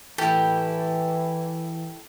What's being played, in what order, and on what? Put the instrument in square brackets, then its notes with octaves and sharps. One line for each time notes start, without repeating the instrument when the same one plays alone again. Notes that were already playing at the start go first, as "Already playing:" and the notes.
[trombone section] E3 [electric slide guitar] E4 A4 [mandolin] G4